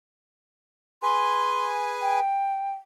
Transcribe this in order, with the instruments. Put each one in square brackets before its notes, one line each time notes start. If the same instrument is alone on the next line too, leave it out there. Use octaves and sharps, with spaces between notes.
[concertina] G#4 B4 G#5 [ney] C6
[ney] G5